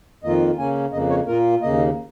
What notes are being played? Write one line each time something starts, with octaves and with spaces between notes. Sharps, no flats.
F2 D#3 A#3 F4 D#5
C#3 A#3 C#4 G#5
F2 C#3 A#3 D#5
C#5
A#2 A#3 F4 A#4
D#2 C#3 A#3 D#5